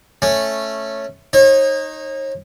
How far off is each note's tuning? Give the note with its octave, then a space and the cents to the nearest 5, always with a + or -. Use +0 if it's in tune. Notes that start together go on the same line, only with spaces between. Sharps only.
A3 +0 C#4 -5
D#4 +0 C#5 -40